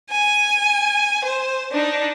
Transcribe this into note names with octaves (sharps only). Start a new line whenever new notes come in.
G#5
C5
D4 D#4